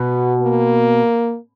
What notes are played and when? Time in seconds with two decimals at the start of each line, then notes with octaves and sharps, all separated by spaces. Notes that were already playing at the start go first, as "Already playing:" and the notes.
Already playing: B2 B3
0.41 A#3